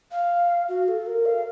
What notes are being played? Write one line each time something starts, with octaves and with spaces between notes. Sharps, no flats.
F5
F#4
A4
A#4
F5